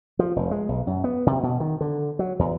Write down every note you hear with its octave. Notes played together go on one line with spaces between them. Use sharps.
F3
F1
G#3
B1
F#2
B3
C3
B2
D#3
D3
F#3
E2